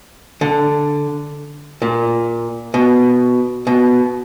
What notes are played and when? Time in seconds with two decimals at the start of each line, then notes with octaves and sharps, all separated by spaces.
0.41 D3
1.82 A#2
2.74 B2
3.67 B2